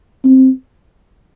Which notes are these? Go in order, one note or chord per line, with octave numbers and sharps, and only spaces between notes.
C4